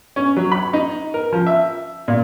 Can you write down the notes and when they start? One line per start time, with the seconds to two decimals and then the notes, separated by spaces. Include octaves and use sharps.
0.16 C#4
0.37 F#3
0.52 B5
0.73 D#4
1.14 A#4
1.32 F3
1.47 E5
2.08 A#2